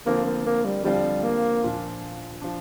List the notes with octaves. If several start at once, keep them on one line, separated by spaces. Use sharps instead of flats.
D3 F3 A#3 C4 F4
A#3
A#3
G3
D3 F3 G3 C4 F4
A#3
A#2 F3 D4
F3 D4